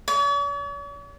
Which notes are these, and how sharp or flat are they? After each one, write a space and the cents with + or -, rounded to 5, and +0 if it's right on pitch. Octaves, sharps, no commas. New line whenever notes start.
C#5 +45